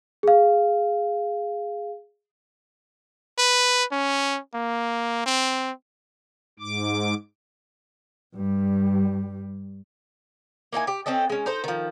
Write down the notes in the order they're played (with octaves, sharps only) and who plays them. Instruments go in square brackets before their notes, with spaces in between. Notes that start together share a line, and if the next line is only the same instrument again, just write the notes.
[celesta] G#4 F5
[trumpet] B4
C#4
A#3
C4
[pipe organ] G#2 D6
[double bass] G2 G3
[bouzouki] A#3 D#4 E4 G#5
G4
C4 C#4 A4 D#5
G#3 C#4
D#4 A4 C5
D#3 F3